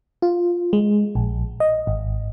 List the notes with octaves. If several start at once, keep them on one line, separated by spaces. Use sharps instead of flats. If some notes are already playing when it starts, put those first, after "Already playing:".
F4
G#3
A#1
D#5
G#1